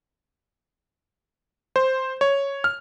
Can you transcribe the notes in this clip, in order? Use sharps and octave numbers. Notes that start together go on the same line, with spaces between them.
C5
C#5
F6